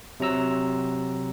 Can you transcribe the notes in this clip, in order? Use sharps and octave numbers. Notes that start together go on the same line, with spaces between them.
C3 F#3 A#5 E6